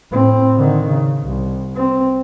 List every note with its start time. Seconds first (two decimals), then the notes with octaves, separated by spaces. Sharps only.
0.11 A2 C4
0.56 D3 D#3
0.88 C#3
1.25 C2
1.75 C4